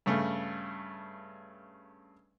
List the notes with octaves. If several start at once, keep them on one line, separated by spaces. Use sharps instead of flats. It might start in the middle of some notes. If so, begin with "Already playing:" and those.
G2 C#3 A3